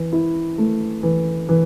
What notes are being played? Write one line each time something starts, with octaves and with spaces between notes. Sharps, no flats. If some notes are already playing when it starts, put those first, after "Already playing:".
Already playing: E3
E4
A3
E3
E3